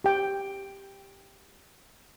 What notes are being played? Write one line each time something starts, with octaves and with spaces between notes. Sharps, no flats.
G4 G5